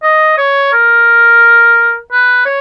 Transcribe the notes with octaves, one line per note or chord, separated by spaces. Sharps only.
D#5
C#5
A#4
B4
C#5